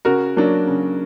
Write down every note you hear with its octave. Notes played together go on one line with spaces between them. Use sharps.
C#3 F#4 A#4
F#3 A#3 D4
C#3